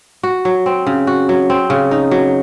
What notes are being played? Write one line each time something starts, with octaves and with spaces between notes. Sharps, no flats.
F#4
F#3
C4
C#3
F#4
F#3
C4
C#3
D#4
F#3